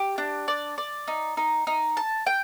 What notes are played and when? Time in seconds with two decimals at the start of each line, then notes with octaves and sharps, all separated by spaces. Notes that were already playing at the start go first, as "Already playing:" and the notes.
Already playing: G4
0.18 D4
0.48 D5
0.78 D5
1.08 D#4
1.37 D#4
1.67 D#4
1.97 A5
2.26 G5